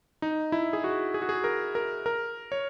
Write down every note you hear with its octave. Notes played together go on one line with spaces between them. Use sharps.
D#4
E4
G#4
F#4
G#4
F#4
G#4
A#4
A#4
A#4
C#5